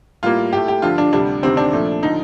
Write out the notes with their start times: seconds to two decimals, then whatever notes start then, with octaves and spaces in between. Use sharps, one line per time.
0.23 A2 G3 A#3 F4
0.53 A2 A3 G4
0.68 G4
0.82 G2 D3 F3 F4
0.98 D4
1.13 D2 C3 G3 D4
1.43 D2 C3 D#3 C4
1.57 D4
1.73 A#2 F3 A3
2.02 D3 F3 D#4